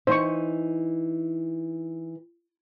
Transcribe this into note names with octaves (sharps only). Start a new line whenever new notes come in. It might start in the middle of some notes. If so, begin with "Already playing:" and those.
E3 D#4 C5 C#6